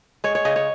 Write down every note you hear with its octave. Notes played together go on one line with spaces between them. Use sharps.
G#3 C#5
C#5
C#3 D#5
C#5